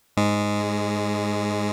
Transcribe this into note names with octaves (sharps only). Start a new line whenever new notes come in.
G#2 G#3